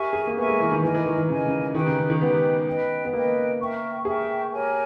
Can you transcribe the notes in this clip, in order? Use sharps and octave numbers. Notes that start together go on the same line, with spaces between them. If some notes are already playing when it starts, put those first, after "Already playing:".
Already playing: G4 A#4 E5 G#5 C#6
G#4
A#3
B3 A#4 E5 G#5 C#6
G#3
E3
D#3
E3 A#4 D#5 G#5
E3
D#3
D#3
C#3 A#4 D#5 G#5
C#3
D#3 D#4 G4 B4 G5
C#3
C#3
D#3
B3 D#4 G4 B4 G5
B4 D#5 G5
B3
A#3 B4 D#5 G5
A#4 E5 G5 C#6
G#4 A#4 E5 G5 C#6
G4 A#4 C#5 G#5